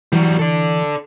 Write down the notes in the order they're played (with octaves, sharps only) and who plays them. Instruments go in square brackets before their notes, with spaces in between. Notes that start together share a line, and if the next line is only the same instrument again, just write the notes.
[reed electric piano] E3 [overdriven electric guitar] F#3 G3
[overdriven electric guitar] A4 D5